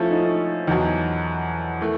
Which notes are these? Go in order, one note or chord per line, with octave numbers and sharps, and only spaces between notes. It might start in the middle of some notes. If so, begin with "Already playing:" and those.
Already playing: F3 A3 C#4 E4 F4 A4
D#4
E2 B2 F#3 D#4
E3 A3